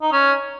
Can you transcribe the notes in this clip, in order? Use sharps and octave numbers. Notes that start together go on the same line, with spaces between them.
D#4
C#4